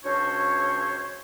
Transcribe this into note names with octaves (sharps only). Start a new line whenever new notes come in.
C#2 C#4 D4 F#4 C5 C#5